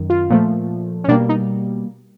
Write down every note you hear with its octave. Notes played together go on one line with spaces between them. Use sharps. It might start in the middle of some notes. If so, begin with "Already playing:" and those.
Already playing: F#2 D#3
F4
A#2 F3 A3
C#4
B2 G3 A#3 D4
D#4